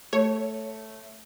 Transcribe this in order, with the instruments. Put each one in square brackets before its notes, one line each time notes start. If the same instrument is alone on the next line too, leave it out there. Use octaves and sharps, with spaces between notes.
[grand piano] A3 [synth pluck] C#5